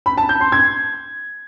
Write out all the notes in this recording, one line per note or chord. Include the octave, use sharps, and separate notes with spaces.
B5
A5
G6
C6
G#6